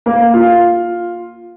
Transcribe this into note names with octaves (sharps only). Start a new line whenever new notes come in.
A#3
F4